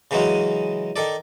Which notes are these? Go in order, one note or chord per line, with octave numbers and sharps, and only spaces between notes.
C#3 E3 F#3 G#3 C#4
D#3 A4 D5